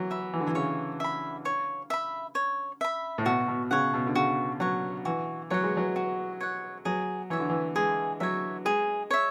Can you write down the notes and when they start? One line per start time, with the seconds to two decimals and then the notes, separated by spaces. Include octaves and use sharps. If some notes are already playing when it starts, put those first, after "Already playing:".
Already playing: E3 F#3
0.11 E5 B5
0.33 E3
0.40 D3
0.47 E3
0.55 C#3 C#5
1.00 E5 B5
1.45 C#5
1.90 E5 B5
2.35 C#5
2.81 E5 B5
3.18 A2
3.25 B2 F#4
3.48 B2
3.71 C#3 C#5 F#5
3.94 B2
4.07 D3
4.15 C#3 F#4
4.60 F#3 C#5 F#5
5.05 E3 F#4
5.50 F#3 C#5 F#5
5.63 G#3
5.77 F#3
5.96 F#4
6.41 C#5 F#5
6.85 F#3 G#4
7.30 E3 C#5 E5
7.40 D3
7.50 E3
7.76 G#3 G#4
8.20 F#3 C#5 E5
8.65 G#3 G#4
9.11 C#5 E5